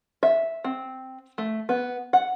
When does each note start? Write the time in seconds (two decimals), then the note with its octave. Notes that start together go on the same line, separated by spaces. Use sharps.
0.23 E5
0.65 C4
1.38 A3
1.69 B3
2.13 F#5